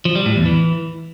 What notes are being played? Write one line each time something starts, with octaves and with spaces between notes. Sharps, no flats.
F3
G3
A2
E2
E3